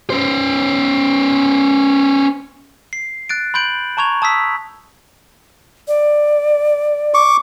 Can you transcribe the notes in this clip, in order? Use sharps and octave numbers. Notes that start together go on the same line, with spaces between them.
C#4 C5
C7
F#6 A6 D7
B5 C6 G6 D7 F#7
A5 A#5 C#6 G#6 F7
A5 D#6 E6 B6
D5
C#6 D6